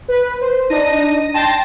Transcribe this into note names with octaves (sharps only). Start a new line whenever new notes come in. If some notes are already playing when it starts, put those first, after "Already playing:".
B4
C5
D4 D#4 A#6 D#7
G5 A5 C6 A6 A#6 E7